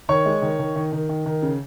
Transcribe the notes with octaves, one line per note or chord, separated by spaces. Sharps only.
D#3 C#5 C#6
G#3
D#3
D#3
D#3
D#3
D#3
D#3
C#3